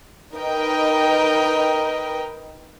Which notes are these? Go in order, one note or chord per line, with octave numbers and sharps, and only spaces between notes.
D#4 A#4 B4 D#5 G5